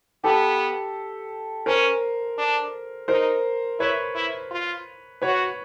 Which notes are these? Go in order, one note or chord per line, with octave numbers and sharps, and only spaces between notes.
B3 G4 A4
C#4 A#4 C5
D4
D#4 A#4 C5
E4 B4 C#5
E4
F4
F#4 B4 C#5